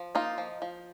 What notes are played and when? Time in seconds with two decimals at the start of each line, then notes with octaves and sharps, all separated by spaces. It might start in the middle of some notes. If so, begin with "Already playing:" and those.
Already playing: F3
0.15 A#3 D#4 F4
0.38 F3
0.62 F3